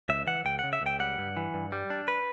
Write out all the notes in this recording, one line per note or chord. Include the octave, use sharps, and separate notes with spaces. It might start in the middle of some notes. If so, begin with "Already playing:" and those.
C#2 E5
E3 F#5
C#2 G5
F#5
C#3
E5
C#2 G5
G3 F#5
G2
E3
G2
G3
D4
B4